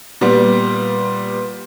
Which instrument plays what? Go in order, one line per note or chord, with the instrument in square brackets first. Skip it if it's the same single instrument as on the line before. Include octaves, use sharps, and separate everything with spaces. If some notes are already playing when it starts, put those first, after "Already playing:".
[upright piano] A#2 G3 B3